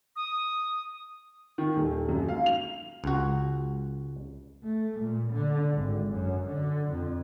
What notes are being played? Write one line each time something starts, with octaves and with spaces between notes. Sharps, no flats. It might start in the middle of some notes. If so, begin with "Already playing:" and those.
D#6
D#3
D#1
F#2
F5
F7
C#2 F#4
A3
A#2
D3
G#1
F#2
D3
F2